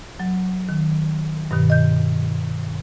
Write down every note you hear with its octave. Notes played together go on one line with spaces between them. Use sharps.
F#3
D#3
G2 B2 D#3
D#5 G6